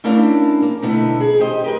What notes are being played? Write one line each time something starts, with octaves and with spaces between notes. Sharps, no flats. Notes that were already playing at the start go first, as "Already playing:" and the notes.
A3 C#4 D4 E4 A#4 F5
A#3
B2 D3 A3 B3 D#4 E4
G#4
G4 C5 D#5
G4 A#4 B4